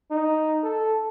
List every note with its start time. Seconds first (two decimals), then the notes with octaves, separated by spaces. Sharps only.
0.11 D#4
0.63 A4